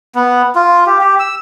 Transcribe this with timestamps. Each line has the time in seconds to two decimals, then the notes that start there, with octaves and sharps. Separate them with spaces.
0.15 B3
0.55 F4
0.86 G4
1.01 G4
1.19 E6